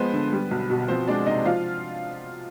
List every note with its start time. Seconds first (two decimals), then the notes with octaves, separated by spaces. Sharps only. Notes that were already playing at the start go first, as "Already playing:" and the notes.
Already playing: F3 G#3 B3 B4 C5
0.13 D3
0.33 G3
0.51 B1
0.70 B2
0.88 F3 C4 C5
1.07 G#3 D4 D5
1.26 C3 D#4 D#5
1.45 F3 F4 F5